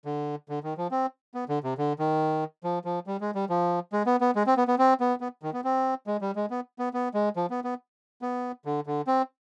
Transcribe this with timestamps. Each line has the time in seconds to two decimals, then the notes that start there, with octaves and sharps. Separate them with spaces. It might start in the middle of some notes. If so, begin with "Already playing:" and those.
0.05 D3
0.49 D3
0.64 D#3
0.77 F3
0.91 C4
1.34 B3
1.49 D3
1.64 C3
1.78 D3
1.99 D#3
2.64 F3
2.85 F3
3.07 G3
3.21 G#3
3.35 G3
3.49 F3
3.93 G#3
4.06 B3
4.21 B3
4.36 G#3
4.47 C4
4.57 B3
4.68 B3
4.79 C4
5.00 B3
5.21 B3
5.43 D#3
5.53 B3
5.64 C4
6.07 G#3
6.21 G3
6.36 G#3
6.50 B3
6.79 B3
6.94 B3
7.14 G#3
7.36 F3
7.50 B3
7.64 B3
8.22 B3
8.65 D3
8.86 D3
9.07 C4